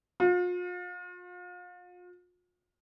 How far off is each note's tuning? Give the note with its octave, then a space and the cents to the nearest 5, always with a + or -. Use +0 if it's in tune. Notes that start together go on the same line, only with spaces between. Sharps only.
F4 +40